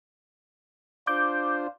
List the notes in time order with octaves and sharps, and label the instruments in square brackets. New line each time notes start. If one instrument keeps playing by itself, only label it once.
[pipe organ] D4 F4 C5 [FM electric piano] D6 G6